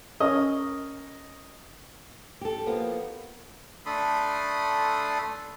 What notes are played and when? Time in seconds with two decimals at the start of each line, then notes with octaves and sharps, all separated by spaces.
0.20 C#4 A#4 C#5 D#5
2.41 G4 A4
2.66 F3 A#3 B3
3.86 A3 D4 A4 B5 C6 D#6